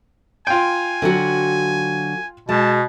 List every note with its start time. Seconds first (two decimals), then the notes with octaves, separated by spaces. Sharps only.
0.47 F4 G5 G#5
1.02 D3 F#3 F#4
2.49 B2 G#3 A5